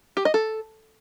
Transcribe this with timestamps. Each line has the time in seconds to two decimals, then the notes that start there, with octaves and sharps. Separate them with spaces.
0.17 G4
0.25 D#5
0.34 A4